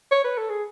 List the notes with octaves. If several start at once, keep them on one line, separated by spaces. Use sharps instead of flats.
C#5
B4
A4
G#4